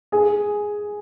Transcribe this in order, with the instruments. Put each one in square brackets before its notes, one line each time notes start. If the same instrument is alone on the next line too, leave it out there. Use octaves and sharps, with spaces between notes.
[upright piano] G#4